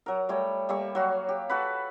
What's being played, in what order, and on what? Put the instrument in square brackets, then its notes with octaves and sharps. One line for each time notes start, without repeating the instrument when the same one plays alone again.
[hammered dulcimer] F#3 A#4
G3 A3 C#5
G3 A#3 E5 C#6
F#3 F#4 F5
G4
F#4 A4 B4 B5